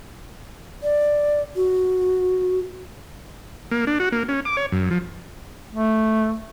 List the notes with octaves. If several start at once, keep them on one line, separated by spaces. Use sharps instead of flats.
D5
F#4
A#3
D4
F#4
A#3
C#4
D6
C#5
F#2
F3
A3